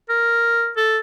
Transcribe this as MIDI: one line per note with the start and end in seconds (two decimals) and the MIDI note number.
0.09 0.71 70
0.77 0.99 69